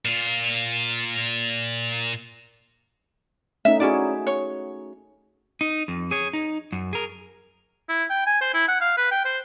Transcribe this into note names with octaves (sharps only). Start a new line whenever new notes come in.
A#2 F4
A3 C#4 D#4 E5
C#4 D#4 E4 F#4 G#4 D5
C#5
D#4
F2
G#4 C#5
D#4
F#2
G#4 A#4
E4
G5
G#5
C5
E4
F#5
F5
B4
G5
C5